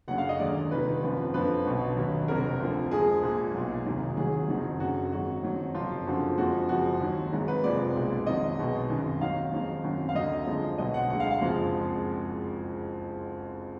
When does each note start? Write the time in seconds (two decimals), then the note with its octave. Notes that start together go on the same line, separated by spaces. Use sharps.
0.08 F#1 F#2 D3 F#3 F#5
0.18 F5
0.29 D#5
0.39 D#2 D3 G#3 D5
0.71 F1 D#2 D#3 B4
1.02 G#1 F#2 F3
1.34 F2 D3 F3 B4
1.66 B1 B2 F#3
1.97 D#2 D3 F#3
2.28 F1 F2 D3 A#4
2.60 D2 D3 F3
2.91 F2 F3 G#3 G#4
3.23 A#1 A#2 G#3
3.54 B1 A#2 F#3
3.86 F1 D#2 D#3
4.17 D#2 D#3 F#3 G#4
4.49 F#1 F2 D#3 F#3
4.80 F#1 F#2 D3 F#4
5.12 G#1 G#2 F#3 F#4
5.43 F2 D#3 F#3
5.75 F#1 F2 F3 F4
6.06 F#1 F#2 D3 F3 F#4
6.37 F2 F3 G#3 F#4
6.69 F#1 F2 F3 G#3 F#4
7.01 D#2 D#3 F#3
7.32 G#1 G#2 F#3
7.48 B4
7.64 F1 F2 F3 G#3 D5
7.95 B1 A#2 G#3
8.26 F2 D#3 F#3 D#5
8.58 B1 B2 G#3
8.89 G#1 F#2 D#3
9.21 D#2 D#3 F#3 F5
9.53 F2 D#3 G#3
9.84 G#1 F#2 D#3 F#3
10.09 F5
10.15 D2 D3 F#3 D#5
10.47 F2 D3 F3 G#3
10.78 B1 B2 F#3 D#5
10.94 F#5
11.10 D2 D3 G#3 F#5
11.20 F5
11.31 F5
11.41 F#1 F2 F3 G#3